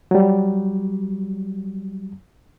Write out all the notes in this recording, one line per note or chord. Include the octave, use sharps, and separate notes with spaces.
F#3 G3